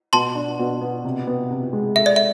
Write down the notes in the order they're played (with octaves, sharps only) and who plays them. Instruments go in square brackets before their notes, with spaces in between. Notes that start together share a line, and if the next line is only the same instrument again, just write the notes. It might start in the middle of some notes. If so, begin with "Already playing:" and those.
[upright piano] B2 [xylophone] A5 C6
[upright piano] D4
B2
B3
C3
B3
C3
G#3
[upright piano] A4 [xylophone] E5
[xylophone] D5
E5